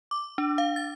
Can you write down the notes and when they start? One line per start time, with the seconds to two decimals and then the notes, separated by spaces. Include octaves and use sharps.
0.11 D6
0.38 D4
0.58 F5
0.76 A6